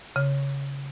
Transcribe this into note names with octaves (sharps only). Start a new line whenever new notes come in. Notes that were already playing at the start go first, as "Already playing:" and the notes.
C#3